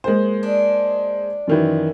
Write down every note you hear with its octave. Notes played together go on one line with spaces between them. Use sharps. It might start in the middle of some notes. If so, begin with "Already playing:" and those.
G#3 A#3 C5
D4
F#2 D#3 E3